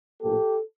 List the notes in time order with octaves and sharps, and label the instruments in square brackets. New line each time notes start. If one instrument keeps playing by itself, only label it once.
[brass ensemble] A#1 A2 F3 A#3 G4 A4